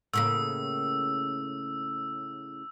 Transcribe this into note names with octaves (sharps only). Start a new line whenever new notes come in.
A2 C#3 A#3 E6